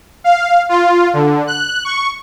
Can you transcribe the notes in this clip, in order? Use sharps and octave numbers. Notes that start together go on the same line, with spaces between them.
F5
F4
D3
F#6
C#6